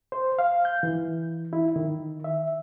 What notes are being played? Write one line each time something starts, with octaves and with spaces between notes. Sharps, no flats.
C5
F5
G6
E3
E4
D#3
E5